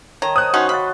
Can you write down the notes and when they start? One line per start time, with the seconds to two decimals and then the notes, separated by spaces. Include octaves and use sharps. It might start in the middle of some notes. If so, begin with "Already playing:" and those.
0.22 D#3 C#5 A5 A#5
0.36 C5 D#6 F#6
0.54 C#4 D#4 F#4 C#5 F#5 C6
0.69 F5 F#5 A5 B5